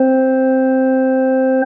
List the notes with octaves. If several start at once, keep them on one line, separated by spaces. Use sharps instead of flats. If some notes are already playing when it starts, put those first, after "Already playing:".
Already playing: C4 C5